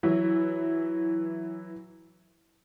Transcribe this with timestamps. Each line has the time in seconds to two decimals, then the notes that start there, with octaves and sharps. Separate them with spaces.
0.03 E3 F#3 E4